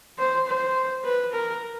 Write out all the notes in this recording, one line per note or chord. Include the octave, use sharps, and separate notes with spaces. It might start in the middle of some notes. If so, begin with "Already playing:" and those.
C5
C5
B4
A#4